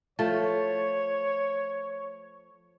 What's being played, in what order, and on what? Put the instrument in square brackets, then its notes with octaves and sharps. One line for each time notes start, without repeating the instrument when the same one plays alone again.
[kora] F3 A3 [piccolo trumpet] C#5